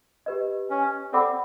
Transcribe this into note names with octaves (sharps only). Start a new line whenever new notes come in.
G4 B4 D#5
C#4
C4 A4 D5 F#5 B5 D6